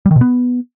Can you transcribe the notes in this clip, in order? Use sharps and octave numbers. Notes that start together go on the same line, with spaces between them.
G3
D#3
B2
B3